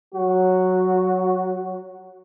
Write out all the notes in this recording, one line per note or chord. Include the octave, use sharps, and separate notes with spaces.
F#3 F#4